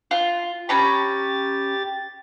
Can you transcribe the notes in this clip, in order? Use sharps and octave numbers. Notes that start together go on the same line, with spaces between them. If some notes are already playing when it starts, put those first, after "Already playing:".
F4
C#4 G4 A#5 B5 A6